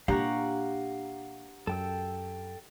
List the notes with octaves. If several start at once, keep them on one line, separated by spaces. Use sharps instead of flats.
A#2 D4 G4 F5 F#5 A#5 C#6
F#2 A4 G5 E6